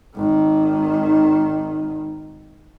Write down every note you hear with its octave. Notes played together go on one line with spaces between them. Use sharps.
G#1 D#3